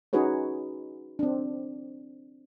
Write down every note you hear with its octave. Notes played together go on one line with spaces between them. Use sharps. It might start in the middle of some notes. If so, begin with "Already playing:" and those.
C#4 D#4 F#4 G#4 B4 C#5
C4 D4